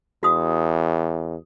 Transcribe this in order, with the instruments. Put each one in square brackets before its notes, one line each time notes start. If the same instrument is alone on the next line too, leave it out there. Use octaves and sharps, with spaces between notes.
[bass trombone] E2 [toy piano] F#4 D#6